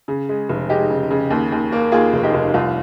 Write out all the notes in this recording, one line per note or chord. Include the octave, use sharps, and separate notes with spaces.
C#3
G#3
F1
G#3 D#4 G4
C#3
C#3
D#2
D#2
A#3
D#2 F4 G#4
F1
D#4 G4
F1
C2 F4